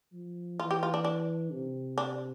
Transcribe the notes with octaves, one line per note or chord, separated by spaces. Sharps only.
F3
E3 F4
G4
F4
D4
D4
C3
D4